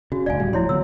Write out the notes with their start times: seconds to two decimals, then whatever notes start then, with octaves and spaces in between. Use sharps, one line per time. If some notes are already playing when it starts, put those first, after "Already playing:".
0.12 C#3 F#4
0.26 E1 D2 D5 F5 G#5
0.39 D#1 A2 G3
0.53 D1 F3 E4 C#5 C6
0.69 D3 F#3 B3 E6